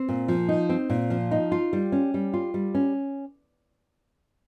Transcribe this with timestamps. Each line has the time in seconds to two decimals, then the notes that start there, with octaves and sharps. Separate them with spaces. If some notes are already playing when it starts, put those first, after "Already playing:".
Already playing: C4
0.09 A#2
0.28 F3
0.48 D#4
0.69 C4
0.90 A#2
1.10 F3
1.31 D#4
1.52 F4
1.73 G3
1.92 C#4
2.14 G3
2.34 F4
2.54 G3
2.75 C#4